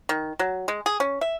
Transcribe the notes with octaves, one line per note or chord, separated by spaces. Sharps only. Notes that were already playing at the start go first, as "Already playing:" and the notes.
D#3
F#3
G#3
G#4
C#4
E5